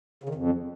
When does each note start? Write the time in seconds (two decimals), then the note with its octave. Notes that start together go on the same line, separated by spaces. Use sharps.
0.24 C#3
0.29 D#3
0.35 F2